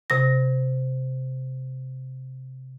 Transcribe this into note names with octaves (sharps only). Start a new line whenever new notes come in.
C3 A#6